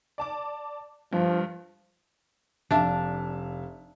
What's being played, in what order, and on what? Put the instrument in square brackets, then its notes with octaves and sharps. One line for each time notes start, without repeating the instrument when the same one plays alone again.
[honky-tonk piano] D5 A5 D6
[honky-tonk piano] G2 [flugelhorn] F3
[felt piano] F1 E5 F5 [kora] D4